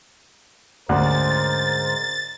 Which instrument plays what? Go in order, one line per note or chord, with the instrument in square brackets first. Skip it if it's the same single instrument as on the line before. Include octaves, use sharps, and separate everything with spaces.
[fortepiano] D2 [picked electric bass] G#2 D3 C#4 [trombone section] G#3 A#4 C5 [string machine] A6